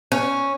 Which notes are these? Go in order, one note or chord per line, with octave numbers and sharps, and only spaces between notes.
C#4